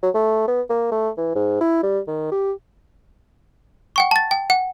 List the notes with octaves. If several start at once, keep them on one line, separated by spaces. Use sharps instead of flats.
F#3
A3
B3
A#3
A3
E3
G#2
E4
G3
D#3
G4
F#5 G5 C#6
A5 A6
G5
F#5